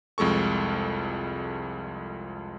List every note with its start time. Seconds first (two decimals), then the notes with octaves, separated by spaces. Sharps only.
0.18 C2 F2 G#3 A4 C#6